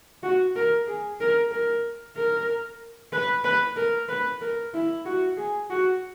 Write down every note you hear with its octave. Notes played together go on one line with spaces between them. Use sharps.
F#4
A#4
G#4
A#4
A#4
A#4
B4
B4
A#4
B4
A#4
E4
F#4
G#4
F#4